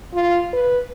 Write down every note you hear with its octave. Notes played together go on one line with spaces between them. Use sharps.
F4
B4